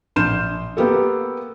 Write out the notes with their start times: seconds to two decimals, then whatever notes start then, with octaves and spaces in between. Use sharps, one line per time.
0.16 A#1 C6 F6 G6 E7
0.77 A#3 B3 G4 A4